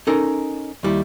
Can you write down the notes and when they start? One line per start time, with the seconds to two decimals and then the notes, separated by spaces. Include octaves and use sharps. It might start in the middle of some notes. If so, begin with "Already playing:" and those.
0.07 C#4 D#4 A4 A#4
0.83 D#2 G3 E4